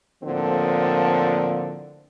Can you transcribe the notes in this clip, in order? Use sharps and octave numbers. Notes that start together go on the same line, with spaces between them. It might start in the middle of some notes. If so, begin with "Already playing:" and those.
A2 D3 F3 A#3 C4